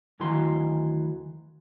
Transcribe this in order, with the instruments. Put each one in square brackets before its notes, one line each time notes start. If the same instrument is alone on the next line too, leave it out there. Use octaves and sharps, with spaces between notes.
[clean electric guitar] D2 D#3 E3 F#3 C6